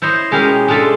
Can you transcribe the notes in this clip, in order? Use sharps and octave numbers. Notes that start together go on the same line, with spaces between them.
E4 C5 C#5 D#5
B2 G#3 C#4 E4 G4 A#4
G#3 D4 F4 A4 E5